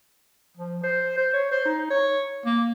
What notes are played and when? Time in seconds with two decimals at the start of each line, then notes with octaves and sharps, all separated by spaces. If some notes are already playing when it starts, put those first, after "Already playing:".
0.57 F3
0.83 C5
1.18 C5
1.34 C#5
1.52 C5
1.65 D#4
1.90 C#5
2.46 A#3